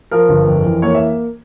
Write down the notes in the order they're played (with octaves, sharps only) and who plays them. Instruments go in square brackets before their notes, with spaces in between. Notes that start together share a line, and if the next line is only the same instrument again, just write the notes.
[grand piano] F3 A#4
G1
F2
E3
A#3 C#5
E5